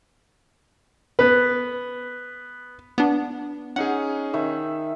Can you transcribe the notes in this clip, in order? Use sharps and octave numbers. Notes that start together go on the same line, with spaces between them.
B3 B4
B3 D4
C#4 D#4 G#4 F#5
D#3 E5